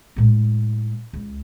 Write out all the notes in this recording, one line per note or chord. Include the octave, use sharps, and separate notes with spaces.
A2 G#3
C#2